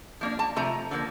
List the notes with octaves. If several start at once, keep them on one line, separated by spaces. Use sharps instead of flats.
F3 A#3 D4
A5
C3 F3 A3 A#5
D3 F3 A#3